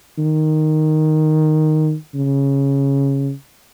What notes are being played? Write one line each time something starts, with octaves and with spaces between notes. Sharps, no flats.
D#3
C#3